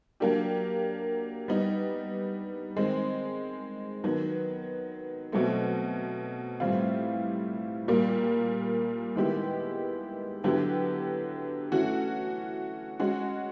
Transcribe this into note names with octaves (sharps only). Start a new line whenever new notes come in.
F#3 A#3 D4 G4
G3 B3 D#4
D#3 G#3 C4
D#3 F#3 B3
B2 F#3 A3 C4
A2 E3 G3 C4 F4
A#2 G3 A#3
D#3 G#3 B3 E4 G4
D3 F#3 B3 E4 G4
E3 A3 C#4 F#4
G#3 C#4 F#4